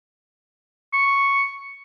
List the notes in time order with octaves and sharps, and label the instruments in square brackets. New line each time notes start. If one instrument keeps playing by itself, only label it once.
[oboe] C#6